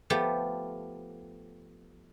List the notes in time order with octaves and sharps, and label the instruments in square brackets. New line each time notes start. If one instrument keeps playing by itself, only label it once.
[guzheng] F3 A3 B3 G4